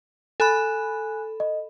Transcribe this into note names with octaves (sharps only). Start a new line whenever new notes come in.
A4 G#5 B5 F#6
D#5